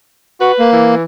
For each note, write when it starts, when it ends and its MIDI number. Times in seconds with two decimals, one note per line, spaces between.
0.40 0.52 66
0.40 0.71 71
0.59 0.95 58
0.73 1.03 52